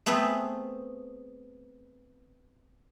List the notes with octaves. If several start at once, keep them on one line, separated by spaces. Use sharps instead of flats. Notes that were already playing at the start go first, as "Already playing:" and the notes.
A3 B3 C4 G#4 B4